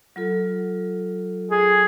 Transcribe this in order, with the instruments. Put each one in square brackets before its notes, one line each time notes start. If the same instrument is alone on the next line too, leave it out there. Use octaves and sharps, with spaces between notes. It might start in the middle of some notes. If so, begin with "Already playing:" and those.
[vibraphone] F#3 F4 A4
[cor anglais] G#4